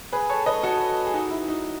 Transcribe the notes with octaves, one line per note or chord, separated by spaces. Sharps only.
G#4 B4
A4 C#5
B4 D#5
F#4 A4
G#4
D#4 F#4
E4
D#4